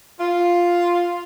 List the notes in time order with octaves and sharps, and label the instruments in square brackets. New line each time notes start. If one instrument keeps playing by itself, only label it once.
[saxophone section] F4